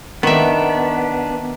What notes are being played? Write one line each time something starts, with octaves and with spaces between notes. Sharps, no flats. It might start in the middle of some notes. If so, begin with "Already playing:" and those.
D#3 B3 D4 E5